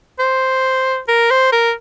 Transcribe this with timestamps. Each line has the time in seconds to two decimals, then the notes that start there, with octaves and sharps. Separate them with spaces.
0.19 C5
1.08 A#4
1.31 C5
1.52 A#4